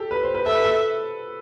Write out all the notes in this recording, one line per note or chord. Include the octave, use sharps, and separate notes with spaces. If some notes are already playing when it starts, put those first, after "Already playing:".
Already playing: G4 A4
B4
C5
B4
A4 E5
B4
A4